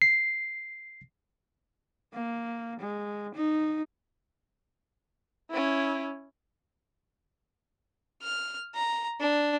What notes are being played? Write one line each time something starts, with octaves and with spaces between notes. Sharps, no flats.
C7
A#3
G#3
D#4
C#4 E4
F6
A#5
D4